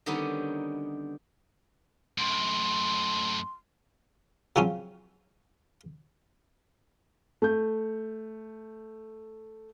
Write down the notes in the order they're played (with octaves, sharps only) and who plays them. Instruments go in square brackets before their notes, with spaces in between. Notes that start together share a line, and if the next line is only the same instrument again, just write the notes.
[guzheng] D3 D#3 G3 B3 C#4 D#4
[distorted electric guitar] F#2 A2 [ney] C6
[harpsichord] C#3 F3 F#3 C4 C#4
[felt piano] A3 G6